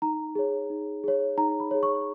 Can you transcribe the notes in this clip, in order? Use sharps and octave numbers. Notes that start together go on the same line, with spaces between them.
D#4 A#5
G#4 C#5
D#4
G#4 C#5
D#4 A#5
B5
G#4 C#5
C#6